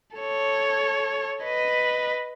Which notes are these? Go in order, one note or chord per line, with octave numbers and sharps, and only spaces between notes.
A4 C#5
B4 D#5